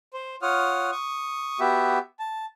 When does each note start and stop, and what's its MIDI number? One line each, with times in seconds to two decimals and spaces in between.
0.13 0.36 72
0.42 0.91 65
0.42 0.91 73
0.42 0.91 78
0.42 0.91 87
0.42 0.91 89
0.92 1.60 85
0.92 1.60 87
1.60 1.99 59
1.60 1.99 66
1.60 1.99 67
1.60 1.99 76
2.19 2.46 81